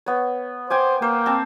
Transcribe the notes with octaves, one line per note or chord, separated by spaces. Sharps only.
B3 C#5
C5 G5 G#5 D6
A#3 C5
C4 A5